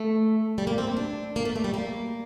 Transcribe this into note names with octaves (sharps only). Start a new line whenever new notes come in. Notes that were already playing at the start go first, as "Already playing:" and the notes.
Already playing: A3
G3
A#3
C4
E4
D4
A#3
A3
A3
G3
A#3